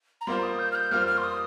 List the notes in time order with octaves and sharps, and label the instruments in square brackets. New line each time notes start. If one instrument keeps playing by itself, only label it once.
[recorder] A#5
[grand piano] G3 A#3 F4 C5 [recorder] C6
[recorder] D#6
G6
F6
G6
[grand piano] G3 A#3 F4 C5 [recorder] F6
[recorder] F6
C6
D#6